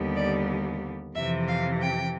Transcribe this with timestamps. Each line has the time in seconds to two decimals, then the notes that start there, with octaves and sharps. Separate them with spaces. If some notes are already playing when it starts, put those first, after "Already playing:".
Already playing: D#2 D3 G3 B3
0.16 D5
1.15 F2 C3 E3 E5
1.48 F5
1.82 G5